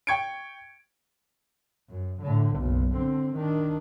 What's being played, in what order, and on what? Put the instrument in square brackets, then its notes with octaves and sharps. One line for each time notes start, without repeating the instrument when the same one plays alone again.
[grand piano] G5 C#6 G#6 C#7 D7
[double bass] F#2
A2 D3
F#1 B1
D3 C4
D#3 D4